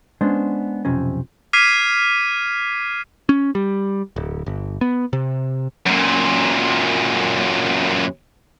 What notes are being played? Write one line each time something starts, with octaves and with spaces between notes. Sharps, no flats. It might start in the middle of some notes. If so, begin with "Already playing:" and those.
G#3 B3 C#4 D4 C5
B1 F2 C3 C4 C#4
D6 F6 G#6 B6 C7 D#7
C#4
G3
D1
G1
B3
C3
F#2 A#2